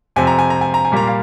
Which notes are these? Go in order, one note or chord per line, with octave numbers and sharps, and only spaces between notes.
F2 C3 F3 G#5
A#5
G#5
A#5
G#5
A#5
G#5
A#2 G3 A#3 A#5
F5